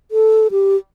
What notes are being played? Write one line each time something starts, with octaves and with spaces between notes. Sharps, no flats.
A4
G4